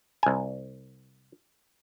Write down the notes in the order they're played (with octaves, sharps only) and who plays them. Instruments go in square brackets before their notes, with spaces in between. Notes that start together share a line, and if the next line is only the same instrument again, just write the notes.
[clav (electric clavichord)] C2 G#5